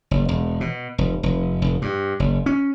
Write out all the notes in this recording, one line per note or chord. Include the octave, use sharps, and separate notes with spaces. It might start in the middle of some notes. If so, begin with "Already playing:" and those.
F#1
E1
B2
F1
F1
F1
G2
F#1
C#4